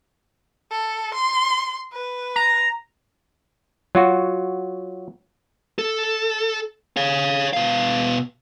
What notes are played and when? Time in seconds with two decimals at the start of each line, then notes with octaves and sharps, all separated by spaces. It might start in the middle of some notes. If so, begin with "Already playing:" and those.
0.71 A4
1.14 C6
1.93 B4
2.36 A#5
3.95 F#3 F4 F#4
5.79 A4
6.97 C#5 F5
7.53 B2 F5